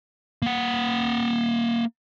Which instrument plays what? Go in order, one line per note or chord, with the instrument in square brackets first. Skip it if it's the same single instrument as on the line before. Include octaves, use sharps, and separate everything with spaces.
[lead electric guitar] A#3 F#5